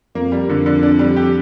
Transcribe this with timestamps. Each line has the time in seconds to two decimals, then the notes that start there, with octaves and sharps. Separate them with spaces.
0.15 F2 A#3
0.32 G3
0.49 F2 D3
0.66 D3
0.83 D4
0.99 G3
1.16 G4